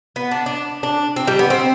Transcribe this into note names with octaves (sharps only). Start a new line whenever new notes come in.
B3
D4
D4
D4
C4
G3
B3
C4